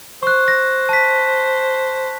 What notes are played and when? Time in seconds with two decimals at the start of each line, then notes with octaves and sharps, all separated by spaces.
0.23 C5 C#6 F#6
0.48 A#6
0.89 A5 B6